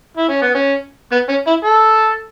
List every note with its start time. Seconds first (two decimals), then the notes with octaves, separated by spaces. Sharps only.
0.17 E4
0.29 C#4
0.42 B3
0.55 C#4
1.12 B3
1.29 C#4
1.47 E4
1.64 A4